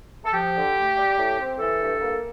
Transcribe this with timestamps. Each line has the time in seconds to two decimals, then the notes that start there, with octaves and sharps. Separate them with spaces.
0.25 A4
0.34 F3 G4
0.55 D3
0.76 A3
0.97 G3
1.17 A2
1.38 C4
1.59 E3 A4
1.80 G2
2.01 A#3